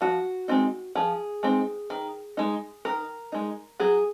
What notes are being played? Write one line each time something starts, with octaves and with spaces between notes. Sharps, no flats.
F3 F#4
G#3 C4 D#4
F3 G#4
G#3 C4 D#4
D#3
G#3 D#4
D#3 A#4
G#3 D#4
F#3 G#4